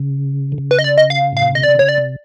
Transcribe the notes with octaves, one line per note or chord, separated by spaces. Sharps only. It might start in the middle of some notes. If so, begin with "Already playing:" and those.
Already playing: C#3
D3
C#3
B4
D#5
D5
D#5
F5
A2 F5
A#2
B2 D#5
C3 D5
D3
C#3 C#5
D5
C3